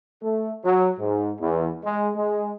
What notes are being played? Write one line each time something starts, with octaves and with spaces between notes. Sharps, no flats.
A3
F#3
G#2
E2
G#3
G#3